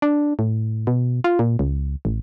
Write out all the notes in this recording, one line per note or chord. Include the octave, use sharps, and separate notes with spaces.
D4
A2
B2
F4
A#2
C#2
A1